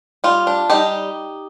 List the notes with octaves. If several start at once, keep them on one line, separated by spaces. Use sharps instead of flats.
G3 F4
D4
G3 D#4 G4